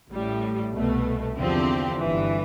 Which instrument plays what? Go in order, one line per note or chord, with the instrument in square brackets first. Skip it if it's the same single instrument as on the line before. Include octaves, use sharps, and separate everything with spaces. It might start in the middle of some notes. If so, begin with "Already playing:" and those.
[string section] A1 A2 G3
C2 B2 A3
E2 D3 F3 C4 G4
G1 G2 E3